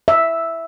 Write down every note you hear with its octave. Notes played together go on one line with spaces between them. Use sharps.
E5